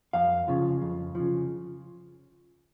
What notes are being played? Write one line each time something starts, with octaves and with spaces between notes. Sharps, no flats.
F2 F5
C#3 F3
F2
C#3 F3